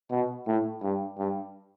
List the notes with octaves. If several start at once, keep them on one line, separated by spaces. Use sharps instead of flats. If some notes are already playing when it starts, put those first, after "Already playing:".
B2
A2
G2
G2